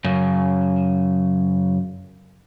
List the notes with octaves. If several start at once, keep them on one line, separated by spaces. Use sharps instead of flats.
F#2 C#3